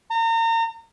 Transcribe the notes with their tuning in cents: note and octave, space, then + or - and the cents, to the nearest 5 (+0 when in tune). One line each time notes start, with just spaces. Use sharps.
A#5 -35